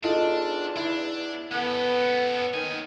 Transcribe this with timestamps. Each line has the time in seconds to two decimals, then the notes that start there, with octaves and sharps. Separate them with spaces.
0.04 E2 D4 D#4 F4 A4
0.76 D4 E4
1.52 B3 C#4 A4
2.54 D#2 D#3 G#5